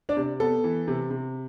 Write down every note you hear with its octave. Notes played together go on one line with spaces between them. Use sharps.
D4 D5
C3
B3 A4
E3
C3
C3